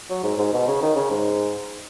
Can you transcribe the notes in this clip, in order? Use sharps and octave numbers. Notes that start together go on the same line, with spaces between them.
F#3
G#2
G#2
B2
C#3
D#3
C#3
G#2